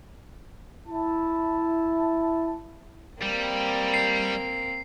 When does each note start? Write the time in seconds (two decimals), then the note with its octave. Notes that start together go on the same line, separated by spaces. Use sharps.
0.87 E4 A5
3.22 G3 A#3 C4
3.94 C7